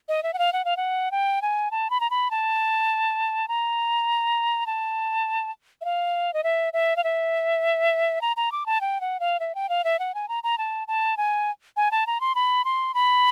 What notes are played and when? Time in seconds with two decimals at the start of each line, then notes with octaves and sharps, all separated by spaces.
0.09 D#5
0.23 E5
0.34 F#5
0.39 F5
0.53 F#5
0.65 F5
0.77 F#5
1.11 G5
1.42 G#5
1.71 A5
1.90 B5
2.00 A#5
2.10 B5
2.31 A5
3.48 A#5
4.66 A5
5.81 E5
5.85 F5
6.34 D#5
6.44 E5
6.73 E5
6.96 F5
7.04 E5
8.21 A#5
8.37 A#5
8.52 D6
8.66 A5
8.81 G5
9.01 F#5
9.20 F5
9.40 E5
9.55 G5
9.69 F5
9.84 E5
9.99 F#5
10.15 G#5
10.29 A#5
10.43 A#5
10.58 A5
10.88 A5
11.17 G#5
11.77 G#5
11.91 A5
12.07 A#5
12.21 C6
12.35 B5
12.65 C6
12.94 B5